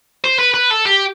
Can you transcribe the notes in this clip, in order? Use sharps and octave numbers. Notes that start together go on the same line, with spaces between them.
C5
B4
B4
A4
G4